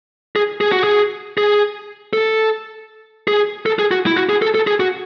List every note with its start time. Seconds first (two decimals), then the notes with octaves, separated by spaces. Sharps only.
0.36 G#4
0.61 G#4
0.72 F#4
0.84 G#4
1.38 G#4
2.13 A4
3.28 G#4
3.66 A4
3.79 G#4
3.91 F#4
4.06 E4
4.16 F#4
4.29 G#4
4.42 A4
4.55 A4
4.67 G#4
4.80 F#4